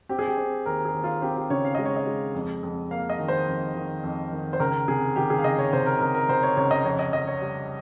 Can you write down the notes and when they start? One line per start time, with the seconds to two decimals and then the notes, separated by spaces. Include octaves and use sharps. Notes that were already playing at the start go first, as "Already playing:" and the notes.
0.09 C4 G4
0.19 G#4
0.27 G4
0.37 C4
0.66 D#2 A#4
0.85 G#4
0.94 D#2
1.04 F4
1.22 C4 G4
1.36 G4
1.50 C#3 C#5
1.65 F5
1.75 G#3 D#5
1.85 C#5
1.96 D#5
2.07 G#3
2.35 F2
2.63 F2
2.91 A#3 F5
3.10 D#5
3.19 D#3
3.28 C5
3.47 F2
3.75 D#3
4.04 F2
4.32 D#3
4.53 C5
4.60 C#2 A#4
4.88 C3 G#4
5.16 D#3 G4
5.30 G#4
5.38 F5
5.44 C#2 D#5
5.59 C#5
5.73 C3 C5
5.86 A#4
6.01 C3 A#4
6.15 A#4
6.28 C3 C5
6.43 C#5
6.57 C#2 C#5
6.71 D#5
6.85 F2 C#5
6.99 D#5
7.13 F2 D#5
7.27 C#5
7.41 G3